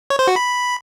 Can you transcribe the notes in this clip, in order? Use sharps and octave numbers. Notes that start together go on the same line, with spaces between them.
C#5
C5
F#4
B5